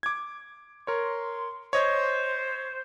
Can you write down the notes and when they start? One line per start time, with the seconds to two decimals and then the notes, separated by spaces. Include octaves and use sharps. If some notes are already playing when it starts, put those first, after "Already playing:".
0.03 D6 G#6
0.87 A#4 C#5 C6
1.73 C5 C#5 D#5 G#6